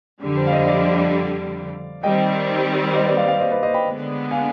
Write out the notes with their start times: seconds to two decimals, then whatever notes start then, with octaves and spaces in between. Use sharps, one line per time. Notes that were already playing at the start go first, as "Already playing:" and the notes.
0.23 F2 D3 G3
0.37 C5
0.47 F5
0.53 C5 D#5
0.68 D5 F5
2.03 D#3 G3 C4 D#5 G5
2.94 C5 D#5
3.06 B4 D5
3.17 D5 F5
3.28 D5 F5
3.40 C5 D#5
3.51 B4 D5
3.63 C5 D#5
3.74 G5 B5
3.85 D3 G#3 B3
4.31 F5 G#5